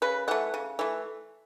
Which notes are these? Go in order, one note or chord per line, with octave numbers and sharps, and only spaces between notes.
C#3 B4
E3 A3 F#5
C#3
E3 A3